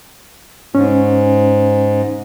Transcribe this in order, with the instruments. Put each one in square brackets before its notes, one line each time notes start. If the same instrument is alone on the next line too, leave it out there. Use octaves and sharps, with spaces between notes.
[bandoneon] G#2 [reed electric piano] C#4